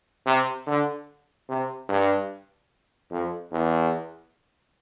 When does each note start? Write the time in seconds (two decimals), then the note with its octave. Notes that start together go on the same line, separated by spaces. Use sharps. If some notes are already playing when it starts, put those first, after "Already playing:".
0.26 C3
0.66 D3
1.49 C3
1.89 G2
3.11 F2
3.52 E2